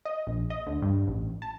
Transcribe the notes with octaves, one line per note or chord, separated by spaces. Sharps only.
D#5
A#1
D#5
D2
G2
A1
A5